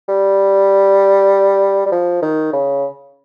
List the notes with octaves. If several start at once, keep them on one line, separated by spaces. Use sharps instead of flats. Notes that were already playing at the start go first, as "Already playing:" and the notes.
G3
G3
F3
D#3
C#3